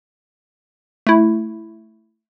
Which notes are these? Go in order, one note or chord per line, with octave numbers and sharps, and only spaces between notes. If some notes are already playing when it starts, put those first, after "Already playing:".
A3 E4